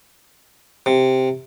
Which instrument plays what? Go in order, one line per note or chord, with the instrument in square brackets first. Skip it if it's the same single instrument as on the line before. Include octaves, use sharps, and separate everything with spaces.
[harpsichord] C3